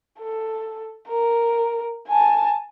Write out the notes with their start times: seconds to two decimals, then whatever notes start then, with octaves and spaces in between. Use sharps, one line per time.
0.19 A4
1.08 A#4
2.08 G#5 A5